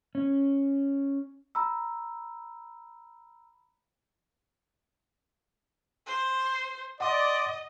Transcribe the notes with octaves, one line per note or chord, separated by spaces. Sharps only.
C#4
A#5 B5 E6
C5
D5 D#5 F#5 C6